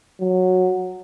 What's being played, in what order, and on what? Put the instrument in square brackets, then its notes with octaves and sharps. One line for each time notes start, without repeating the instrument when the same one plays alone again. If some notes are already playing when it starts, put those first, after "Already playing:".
[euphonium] F#3